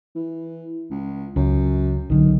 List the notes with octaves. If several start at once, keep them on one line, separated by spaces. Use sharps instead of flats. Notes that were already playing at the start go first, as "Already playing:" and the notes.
E3
C#2
C#2 F#2
B1 D3 D#3 F#3